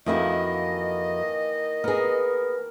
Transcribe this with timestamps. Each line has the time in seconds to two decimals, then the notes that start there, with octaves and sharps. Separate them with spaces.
0.06 F2 D#3 E3 A#3 E4 F#4 D#5
1.84 B3 G#4 A#4